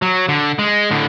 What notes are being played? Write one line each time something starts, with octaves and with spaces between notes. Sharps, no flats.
F#3
D3
G#3
A2 D3